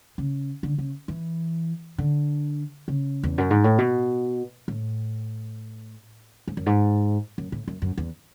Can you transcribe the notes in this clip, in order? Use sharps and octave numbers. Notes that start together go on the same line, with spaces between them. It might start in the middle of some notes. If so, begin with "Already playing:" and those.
C#3
D3
C#3
E3
D3
C#3
E2
F#2
G#2
A2
B2
A2
G#2
F#2
G#2
F#2
A2
F#2
F#2
E2